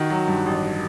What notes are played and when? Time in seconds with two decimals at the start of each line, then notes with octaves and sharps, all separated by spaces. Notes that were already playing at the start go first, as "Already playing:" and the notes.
Already playing: D#3 F#4
0.10 F#3
0.28 G2
0.46 A1